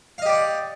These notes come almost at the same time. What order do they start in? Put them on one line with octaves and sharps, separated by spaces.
F5 D#5 G4 D5 F#5